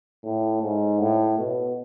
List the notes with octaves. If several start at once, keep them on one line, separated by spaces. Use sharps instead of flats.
A2
G#2
A2
B2